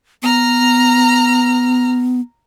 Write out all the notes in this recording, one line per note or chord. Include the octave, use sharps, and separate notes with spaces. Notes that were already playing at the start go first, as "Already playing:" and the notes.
B3 A#5 F6